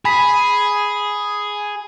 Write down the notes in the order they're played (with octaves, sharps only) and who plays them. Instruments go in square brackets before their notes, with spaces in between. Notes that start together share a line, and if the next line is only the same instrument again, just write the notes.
[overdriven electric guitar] G#4 [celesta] B5 B6